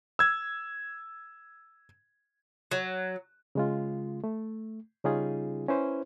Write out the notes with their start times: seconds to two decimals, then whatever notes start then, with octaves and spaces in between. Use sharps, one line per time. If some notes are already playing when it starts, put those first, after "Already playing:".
0.19 E6 G#6
2.71 F#3
3.55 C#3 G#3 F4
4.24 A3
5.04 C#3 G3 C#4 D#4 F4 G#4
5.68 C#4 E4 B4 C5